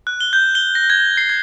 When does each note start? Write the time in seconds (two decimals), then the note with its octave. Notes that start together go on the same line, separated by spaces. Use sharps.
0.07 F#6
0.21 G7
0.33 G6
0.55 G7
0.75 A#6
0.90 G#6
1.17 C7
1.30 G#6